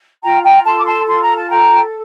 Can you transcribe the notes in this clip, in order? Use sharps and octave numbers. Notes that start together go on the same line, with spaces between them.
F4 G5 A#5
G5 A#5
A4 A5 C6
D6
A5 C6
F4 C6
A#5
A5
A4 G5 A#5